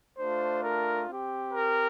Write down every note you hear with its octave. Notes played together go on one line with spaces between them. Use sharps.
A3 D4 F4 C5
A#4
C4 G4
A#4